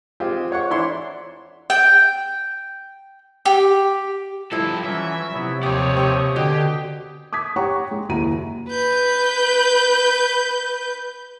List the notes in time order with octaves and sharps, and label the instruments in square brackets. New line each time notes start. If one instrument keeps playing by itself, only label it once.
[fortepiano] G#3 C4 F4 G4
C5 C#5 F#5 C#6
E3 D4 E4 C#5 C6
[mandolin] G5
G4
[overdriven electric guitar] G2 A4 [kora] F3 E4
[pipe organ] E3 F#3 C#4 [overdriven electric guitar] E5
[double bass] C3 [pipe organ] F#3 B3 E4
[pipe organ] D#2 F3 D#6 [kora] G4 [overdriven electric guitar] C#5 D5
[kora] C4 G4
[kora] B2 [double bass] D3 [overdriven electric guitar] G4 [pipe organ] G#4 G5
[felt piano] D6 D#6 G#6 B6
G4 C#5 F#5 G5 A#5 C#6
G#3
F#1 D#2 E4 F#4 A#5 D#7
[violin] B4 G6